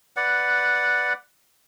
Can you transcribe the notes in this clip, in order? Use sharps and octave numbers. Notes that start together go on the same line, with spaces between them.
B4 D5 F#5